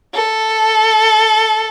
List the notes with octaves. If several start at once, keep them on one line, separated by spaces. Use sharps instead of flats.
A4